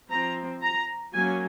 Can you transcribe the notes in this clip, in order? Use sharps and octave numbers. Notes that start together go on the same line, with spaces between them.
F3 C4 A#5
A#5
F#3 A#3 C#4 G#5